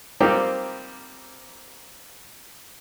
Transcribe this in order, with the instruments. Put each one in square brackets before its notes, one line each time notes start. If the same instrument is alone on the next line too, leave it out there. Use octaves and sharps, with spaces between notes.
[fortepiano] F3 G3 A#3 C4 D#4 G4